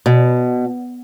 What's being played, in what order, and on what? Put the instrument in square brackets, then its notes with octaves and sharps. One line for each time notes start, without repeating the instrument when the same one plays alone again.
[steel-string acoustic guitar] B2